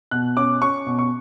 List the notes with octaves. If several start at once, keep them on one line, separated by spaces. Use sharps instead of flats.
B2 F#6
C#4 D6
C#4 C#6
B2
C#6